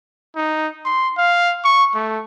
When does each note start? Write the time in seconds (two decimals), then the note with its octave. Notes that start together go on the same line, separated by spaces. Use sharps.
0.36 D#4
0.85 C6
1.18 F5
1.65 C#6
1.95 A3